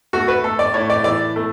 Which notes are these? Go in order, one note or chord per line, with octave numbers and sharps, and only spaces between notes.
A3 F#4
B4
A3 A4
D5
A2 C#5
D5
E3 D5
A3